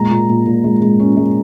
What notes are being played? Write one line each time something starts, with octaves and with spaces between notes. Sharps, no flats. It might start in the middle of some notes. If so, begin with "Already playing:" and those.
Already playing: A#2 G#3 A#5
A#2
A#2
A#2
G#3
G#3
C#4
G#3